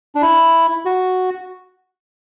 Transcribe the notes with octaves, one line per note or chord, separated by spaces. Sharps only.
D4
E4
F#4